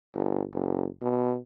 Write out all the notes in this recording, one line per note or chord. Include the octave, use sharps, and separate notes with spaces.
G1
F#1
B2